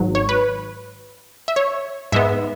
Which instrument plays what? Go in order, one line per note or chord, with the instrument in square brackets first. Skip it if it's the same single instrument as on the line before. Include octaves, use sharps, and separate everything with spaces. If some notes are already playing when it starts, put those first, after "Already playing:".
Already playing: [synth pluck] G#1 G#2 F#3
C#5
B4
E5
C#5
G#2 G#3 B3 E5